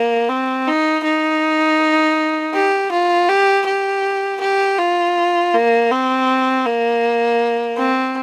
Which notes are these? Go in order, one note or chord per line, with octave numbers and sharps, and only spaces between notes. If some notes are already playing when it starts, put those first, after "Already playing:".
Already playing: A#3
C4
D#4
D#4
G4
F4
G4
G4
G4
F4
A#3
C4
A#3
C4